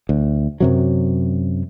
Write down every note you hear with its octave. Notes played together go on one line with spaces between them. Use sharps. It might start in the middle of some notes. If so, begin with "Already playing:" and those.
D2
F#2 C3 F#3